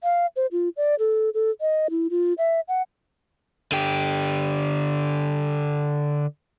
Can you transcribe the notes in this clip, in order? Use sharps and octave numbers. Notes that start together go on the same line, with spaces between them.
F5
C5
F4
D5
A4
A4
D#5
E4
F4
E5
F#5
D3 G4